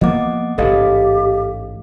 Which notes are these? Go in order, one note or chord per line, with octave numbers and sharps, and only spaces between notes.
F3 A#3 B3 D#5 F#5 D6
A1 G#2 C#3 G4 A4 D#5 F5